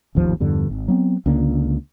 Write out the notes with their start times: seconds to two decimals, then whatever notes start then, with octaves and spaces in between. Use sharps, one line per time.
0.15 D1 G#1 D#2 F3
0.40 E2 G2 D3 F3
0.70 G#1
0.88 F#3 B3 C4
1.26 C#2 D3 A#3